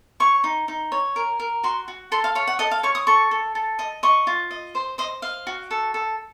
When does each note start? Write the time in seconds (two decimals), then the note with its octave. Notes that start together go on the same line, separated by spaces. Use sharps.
0.20 C#5 C#6
0.44 D#4
0.68 D#4
0.92 C#5
1.16 A#4
1.40 A#4
1.63 F#4 C6
1.88 F#4
2.12 A4 C6
2.24 F5
2.35 C#5 F5
2.47 F#5
2.59 A4 D#5
2.71 F5
2.83 C#5 C#6
2.95 D#6
3.07 A4 C#6
3.31 A4
3.55 A4
3.79 D#5
4.03 D#5 C#6
4.27 F4
4.51 D#5
4.75 C5
4.98 C5 D#5
5.22 D#5 F5
5.47 F#4
5.71 A4
5.94 A4